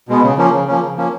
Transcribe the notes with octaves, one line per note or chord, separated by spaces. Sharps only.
B2 G#3 B3
C#3
F3 A#3 C#4
C#3
F3 A#3 C#4
C#3
F3 A#3 C#4